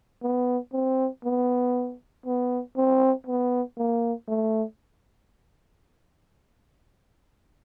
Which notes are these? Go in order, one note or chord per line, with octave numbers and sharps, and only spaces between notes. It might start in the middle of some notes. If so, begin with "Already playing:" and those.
B3
C4
B3
B3
C4
B3
A#3
A3